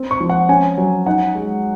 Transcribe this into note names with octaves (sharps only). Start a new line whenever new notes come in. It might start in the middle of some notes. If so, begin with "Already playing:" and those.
Already playing: C4
C#6
F3
F#5
C#4 G#5
F#3
D#4 F#5
G#3